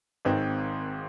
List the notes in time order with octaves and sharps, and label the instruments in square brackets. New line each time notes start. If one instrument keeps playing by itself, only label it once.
[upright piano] G#1 G#2 D#3 C4